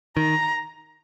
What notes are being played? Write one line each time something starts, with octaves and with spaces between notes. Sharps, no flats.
D#3 A#5